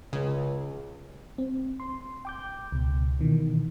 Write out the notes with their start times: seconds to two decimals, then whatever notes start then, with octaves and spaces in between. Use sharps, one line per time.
0.13 C#2 C#3
1.38 C4
1.80 C6
2.25 G5 D6 G6
2.72 C#2 B2
3.19 B2 D#3 E3